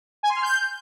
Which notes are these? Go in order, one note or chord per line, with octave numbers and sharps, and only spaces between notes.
G#5
C6
F6
G6